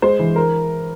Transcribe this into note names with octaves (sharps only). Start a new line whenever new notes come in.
G#3 C5
E3
A#4